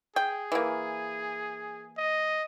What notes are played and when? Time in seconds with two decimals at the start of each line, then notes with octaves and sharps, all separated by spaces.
0.16 G#4 G5
0.52 E3 A#3
1.98 D#5